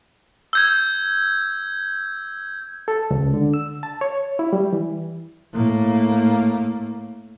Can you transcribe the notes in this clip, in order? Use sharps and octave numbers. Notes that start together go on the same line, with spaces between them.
E6 G6 G#6
A4
C#2
D3
E6
A5
C#5
E4
G3
E3
A2 A#3